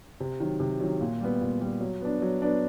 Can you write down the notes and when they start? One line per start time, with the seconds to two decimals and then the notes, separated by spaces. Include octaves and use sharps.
0.20 C3
0.40 D#3 F#3
0.60 C3
0.81 D#3 F#3
1.01 A#2
1.21 G3 B3
1.41 A#2
1.61 G3 B3
1.81 F#3
2.01 B3 D4
2.22 F#3
2.42 B3 D4